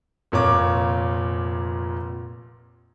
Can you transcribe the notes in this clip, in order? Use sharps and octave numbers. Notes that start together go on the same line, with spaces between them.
F1 A#2 C#5 D6